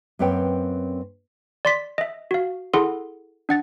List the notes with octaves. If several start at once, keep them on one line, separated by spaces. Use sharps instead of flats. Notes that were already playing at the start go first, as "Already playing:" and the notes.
F#2 A#3 C4 B4 C#5 G5
D5 C6 B6
D#5 E5
F#4 F5
E4 G#4 A4 F#5 C6
D4 F#5 A6